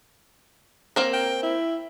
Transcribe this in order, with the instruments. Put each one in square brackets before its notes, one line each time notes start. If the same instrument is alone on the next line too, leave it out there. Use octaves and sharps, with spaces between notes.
[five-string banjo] A#3 C4 A#4
[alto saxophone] G5
E4